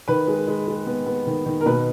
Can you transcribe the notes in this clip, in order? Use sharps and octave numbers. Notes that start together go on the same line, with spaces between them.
D#3 B4
G#3
G#3
G#3
B3
B3
D#3
D#3
A#4
B2 B4